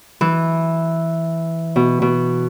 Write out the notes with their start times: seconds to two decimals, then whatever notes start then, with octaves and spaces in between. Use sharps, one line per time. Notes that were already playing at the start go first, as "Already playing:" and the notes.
0.21 E3
1.76 B2
2.02 B2